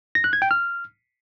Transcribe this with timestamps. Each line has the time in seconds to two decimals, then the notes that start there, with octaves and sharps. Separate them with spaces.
0.15 A#6
0.24 F#6
0.33 G#6
0.42 G5
0.51 F6